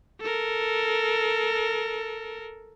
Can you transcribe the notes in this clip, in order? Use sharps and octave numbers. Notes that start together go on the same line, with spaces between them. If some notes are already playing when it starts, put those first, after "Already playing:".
A4 A#4